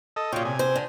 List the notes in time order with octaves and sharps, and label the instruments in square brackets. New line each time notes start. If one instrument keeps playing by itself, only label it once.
[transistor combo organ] A4 D#5
[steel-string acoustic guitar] A#2 C#3 [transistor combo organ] F4 C#5 G5
[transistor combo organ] C3 G#5
[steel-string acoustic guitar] C5
D3